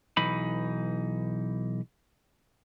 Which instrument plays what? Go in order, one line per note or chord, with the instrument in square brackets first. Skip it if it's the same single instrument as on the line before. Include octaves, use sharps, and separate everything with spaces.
[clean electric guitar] B1 E3 D#4 B5